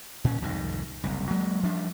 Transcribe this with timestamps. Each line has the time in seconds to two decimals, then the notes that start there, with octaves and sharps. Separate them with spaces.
0.24 A#2 C#4
0.42 C2 F2 G#2 D#3
1.04 F#1 C2
1.31 F#3 G#3 A#3
1.63 F3 G3 D4